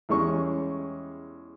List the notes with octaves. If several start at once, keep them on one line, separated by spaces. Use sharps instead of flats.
E2 G3 G#3 C#4 C#6